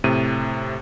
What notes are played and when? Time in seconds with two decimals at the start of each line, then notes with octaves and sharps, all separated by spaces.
0.04 A2 C3 D#7